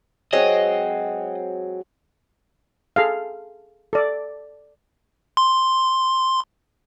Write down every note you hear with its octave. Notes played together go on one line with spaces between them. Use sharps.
F#3 G#3 C4 D#5
G#4 A4 F5
A4 D5
C6